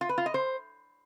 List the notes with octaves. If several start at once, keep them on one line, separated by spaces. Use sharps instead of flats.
F4
B4
F4
D#5
C5